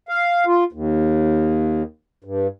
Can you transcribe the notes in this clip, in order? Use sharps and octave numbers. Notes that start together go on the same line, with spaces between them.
F5
F4
D#2
G2